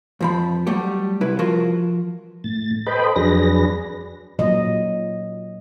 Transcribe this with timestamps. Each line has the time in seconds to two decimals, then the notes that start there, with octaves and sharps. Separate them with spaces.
0.20 F2 F3 B5
0.66 F#3 G3 A3 G4
1.21 C2 E4 B4
1.39 F3 F4 F#4 A#4
2.44 A2 A6
2.87 A4 B4 C5 D#5 G5 B5
3.16 F2 F#3 D4 G#4 B4 A#6
4.39 A#2 F#3 D#5